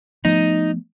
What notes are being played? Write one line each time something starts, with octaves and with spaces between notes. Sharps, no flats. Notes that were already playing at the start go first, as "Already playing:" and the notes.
F3 A3 B3 D#4